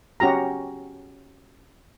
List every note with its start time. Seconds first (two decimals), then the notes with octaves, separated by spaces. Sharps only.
0.20 C#4 F#4 G4 A#5